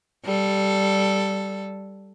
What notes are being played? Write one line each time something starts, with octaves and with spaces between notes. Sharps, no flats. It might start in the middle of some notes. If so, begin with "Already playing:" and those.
G3 A4